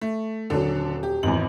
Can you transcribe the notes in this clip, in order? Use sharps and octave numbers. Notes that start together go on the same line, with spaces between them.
A3
D#1 D3 F#3 D4 A4
G4
G#1 E2 F#7